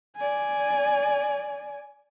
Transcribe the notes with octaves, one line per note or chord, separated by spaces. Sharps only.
D5 G#5